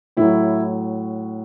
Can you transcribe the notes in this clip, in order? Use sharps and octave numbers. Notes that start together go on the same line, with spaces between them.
A2 F#3 E4